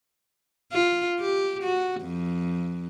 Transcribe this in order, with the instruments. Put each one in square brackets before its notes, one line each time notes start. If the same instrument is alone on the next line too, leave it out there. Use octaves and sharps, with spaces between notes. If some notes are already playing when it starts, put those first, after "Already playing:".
[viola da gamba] F4
G4
F#4
F2